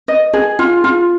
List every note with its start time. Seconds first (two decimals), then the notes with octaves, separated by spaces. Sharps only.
0.08 D#5
0.34 G#4
0.59 F4
0.84 F4